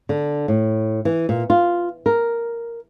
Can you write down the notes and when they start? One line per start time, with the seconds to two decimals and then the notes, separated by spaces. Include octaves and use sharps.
0.09 D3
0.48 A2
1.05 E3
1.29 A#2
1.50 F4
2.06 A#4